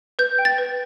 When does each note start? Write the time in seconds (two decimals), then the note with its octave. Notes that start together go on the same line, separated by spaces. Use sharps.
0.19 B4 G6
0.38 G5
0.45 A6
0.58 B4